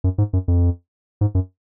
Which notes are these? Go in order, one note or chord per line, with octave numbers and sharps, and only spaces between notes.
F#2
G#2
F#2
F2
G#2
F#2